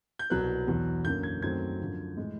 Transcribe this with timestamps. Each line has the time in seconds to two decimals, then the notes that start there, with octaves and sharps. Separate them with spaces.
0.19 G6
0.30 C2 B2 F#3 B3 F#6
0.67 E2 B2 F#3
1.05 F#2 D3 F#3 A#3 C#4 G6
1.23 G#6
1.42 F#2 D#3 F#3 A3 C4 G#6
1.80 F#2 D3 F3
2.17 A2 E3 G#3